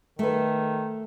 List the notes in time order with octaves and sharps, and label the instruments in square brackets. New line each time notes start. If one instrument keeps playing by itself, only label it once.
[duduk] D#3 [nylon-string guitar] A3 B4